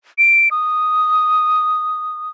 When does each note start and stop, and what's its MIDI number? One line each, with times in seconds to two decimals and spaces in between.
0.18 0.49 98
0.51 2.29 87